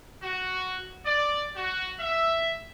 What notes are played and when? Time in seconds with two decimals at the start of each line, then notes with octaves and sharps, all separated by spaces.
0.23 F#4
1.05 D5
1.56 F#4
2.00 E5